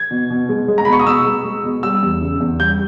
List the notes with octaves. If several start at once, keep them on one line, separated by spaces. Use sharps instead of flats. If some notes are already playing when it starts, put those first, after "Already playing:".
Already playing: G#6
B2
B2
G#3
G#3
A#5
B2 B5
C#6
D#6
B2 E6
G#3
G#3
B2
G3 E6
E2
C#3
E2
G3 G6